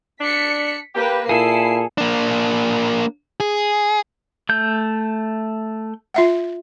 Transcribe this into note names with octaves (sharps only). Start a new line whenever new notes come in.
D4 B6 C#7
A#3 G4 B4
A#2 E4 G#4 A4 C7
A#3 D4
G#4
A3 G6
F4 E5 F#5